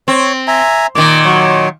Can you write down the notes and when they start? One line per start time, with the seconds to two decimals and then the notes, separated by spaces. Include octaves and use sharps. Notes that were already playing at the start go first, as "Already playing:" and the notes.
0.08 C4 C#5
0.47 E5 G#5 A#5
0.95 A#2 D#3 D6
1.25 F#3 C#5